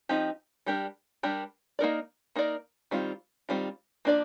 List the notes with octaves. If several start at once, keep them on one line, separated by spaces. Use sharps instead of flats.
F3 C4 D#4 G4
G3 D4 G4 A#4
G3 D4 G4 A#4
A#3 D#4 A#4 D5
A#3 D#4 A#4 D5
D#3 G3 C4 F4
D#3 G3 C4 F4
F3 A#3 D4 A4 D5